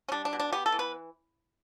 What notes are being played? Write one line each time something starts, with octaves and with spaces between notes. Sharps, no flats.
C#4
G3 D4
D4
B2
D4
B3 G4
A4
E3
B4